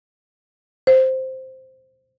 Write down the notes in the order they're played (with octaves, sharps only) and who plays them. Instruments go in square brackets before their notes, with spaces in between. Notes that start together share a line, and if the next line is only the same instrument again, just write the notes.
[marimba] C5